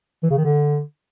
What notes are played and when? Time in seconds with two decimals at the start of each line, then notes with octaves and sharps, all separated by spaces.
0.23 E3
0.30 C#3
0.37 D#3
0.45 D3